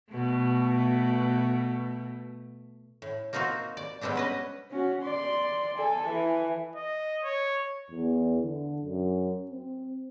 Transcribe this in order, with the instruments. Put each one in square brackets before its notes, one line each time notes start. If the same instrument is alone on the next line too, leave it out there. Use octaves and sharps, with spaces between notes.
[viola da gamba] B2 A3
[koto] A2
A#3 C4 D#4 F4 F#4
D5
G3 G#3 B3 C4 D4
C#4 B4 D#5
[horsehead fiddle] C#4 F#4
[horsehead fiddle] D5 [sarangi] C6
[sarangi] A4 [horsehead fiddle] G#5
[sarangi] E3
[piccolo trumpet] D#5
C#5
[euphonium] E2
D3
F#2
C4